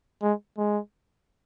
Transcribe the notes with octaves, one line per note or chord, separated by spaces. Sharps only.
G#3
G#3